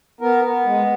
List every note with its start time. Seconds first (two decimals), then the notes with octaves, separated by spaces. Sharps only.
0.21 B3 A#4
0.43 B3
0.66 G#3